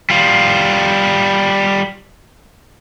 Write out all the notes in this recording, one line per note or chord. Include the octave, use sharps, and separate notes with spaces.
G3 F4